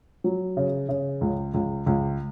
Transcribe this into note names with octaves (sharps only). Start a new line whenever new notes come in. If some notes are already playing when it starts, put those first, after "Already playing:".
F#3
C#3
C#3
C#2
C#2
C#2